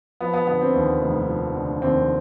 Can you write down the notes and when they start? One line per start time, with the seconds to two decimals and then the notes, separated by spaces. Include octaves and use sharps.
0.21 F3 B3
0.33 B3
0.47 D3 B3
0.61 C4
0.75 D#2
1.02 F1
1.28 F3
1.56 D3
1.82 D#2 C4